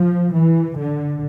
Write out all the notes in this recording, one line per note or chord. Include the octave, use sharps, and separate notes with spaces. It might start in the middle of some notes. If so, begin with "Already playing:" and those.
Already playing: F3
E3
D3